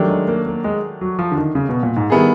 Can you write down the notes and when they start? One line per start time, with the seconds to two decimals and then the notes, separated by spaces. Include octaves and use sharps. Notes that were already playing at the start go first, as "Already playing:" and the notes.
Already playing: D#3 F#3 A3 D4 G4
0.10 G#3
0.28 A#3
0.47 A#3
0.64 G#3
1.01 F#3
1.19 F3
1.32 D3
1.38 D#3
1.55 C#3
1.69 B2
1.83 A#2
1.96 G#2
2.10 D#3 G3 B3 E4 G#4